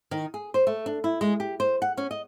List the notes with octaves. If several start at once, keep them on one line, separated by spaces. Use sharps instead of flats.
D#3
G#4
C5
A3
D4
E4
G#3
G4
C5
F#5
C#4
D#5